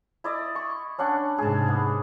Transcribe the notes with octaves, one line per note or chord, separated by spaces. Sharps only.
E4 D5 D#5
C#6
C#4 D4 F#5
G#2 C3 G#4 A5
B3